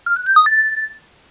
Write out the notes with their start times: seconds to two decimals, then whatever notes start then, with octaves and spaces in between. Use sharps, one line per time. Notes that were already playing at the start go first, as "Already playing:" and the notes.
0.06 F6
0.16 F#6
0.26 G6
0.36 D#6
0.46 A6